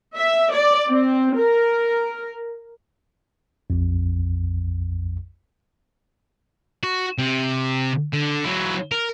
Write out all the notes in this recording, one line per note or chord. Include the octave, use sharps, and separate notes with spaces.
E5
D5
C4
A#4
A#1 F2
F#4
C3
D3
F#3 E4
A#4